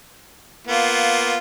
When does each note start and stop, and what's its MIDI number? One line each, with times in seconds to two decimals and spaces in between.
0.67 1.38 58
0.67 1.38 59
0.67 1.38 65